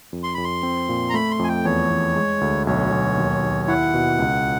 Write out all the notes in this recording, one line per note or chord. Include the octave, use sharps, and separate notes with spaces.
F2
C6
F2 B5
C6
C4
A#2
A#5
A3 B5
C6
F2 G#5
G5
E2 C#5
E2
G#3
D2
B1 C#5
B1
D#2
D#2
E4 F#5
B2
C#2